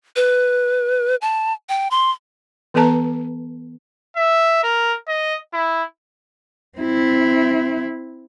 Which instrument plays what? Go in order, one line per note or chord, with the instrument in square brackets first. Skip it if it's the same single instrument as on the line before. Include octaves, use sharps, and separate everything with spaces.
[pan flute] B4
A5
G5
C6
[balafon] E3 B3 A4 B4 A5 A#5
[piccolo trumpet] E5
A#4
D#5
E4
[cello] C4 E4